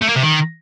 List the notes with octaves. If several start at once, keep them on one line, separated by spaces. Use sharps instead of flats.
A3
A#3
C3
D#3